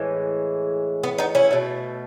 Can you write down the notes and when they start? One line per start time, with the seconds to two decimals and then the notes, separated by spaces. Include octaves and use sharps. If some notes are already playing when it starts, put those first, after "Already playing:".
Already playing: A2 E3 G#3
1.03 B3
1.18 B3 D#4
1.35 C#4 E4
1.51 B2 A3